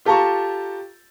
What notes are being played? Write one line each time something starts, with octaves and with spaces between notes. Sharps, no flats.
F4 G4 A4 A5 A#5 C#6